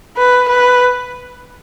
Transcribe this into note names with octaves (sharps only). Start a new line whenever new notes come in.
B4
B4